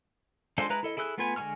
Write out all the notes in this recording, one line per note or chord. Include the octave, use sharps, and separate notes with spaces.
G#3 D4 F4 A4 C5
G#3 E4 B4 A#5 F#6
E4 A4 D#5
E4 G#4 A4 E6 F#6
A3 B3 F4 B4 G#5
D3 G#3 G#5 C#6 F6